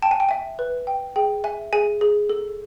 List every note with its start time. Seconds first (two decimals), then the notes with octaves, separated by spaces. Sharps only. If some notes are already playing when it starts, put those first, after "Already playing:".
0.02 G5 A5
0.11 G#5
0.20 G5
0.29 E5 G#5
0.59 B4
0.87 G5
1.16 G#4 G5
1.44 E5 G#5
1.73 G#4 G#5
2.01 G#4
2.30 A4